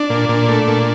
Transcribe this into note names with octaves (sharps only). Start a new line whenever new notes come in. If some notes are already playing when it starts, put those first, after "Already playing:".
Already playing: D4
A#2
A#2
A3
A#2